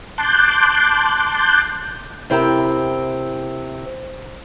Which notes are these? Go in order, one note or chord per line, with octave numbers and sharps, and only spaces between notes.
A5 C6 D6 F#6 G6
C3 C4 E4 G4 A4 A#4